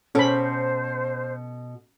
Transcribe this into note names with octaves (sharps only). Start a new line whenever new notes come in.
B2 C#4 A4 C5 B5